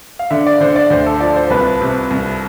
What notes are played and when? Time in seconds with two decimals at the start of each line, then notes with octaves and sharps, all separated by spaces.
0.19 F5
0.30 D3 E5
0.47 D5
0.60 D3 C5
0.76 D5
0.90 D2 C5
1.06 A4
1.20 F3 D5
1.36 C5
1.50 C2 B4
1.81 C3
2.10 C2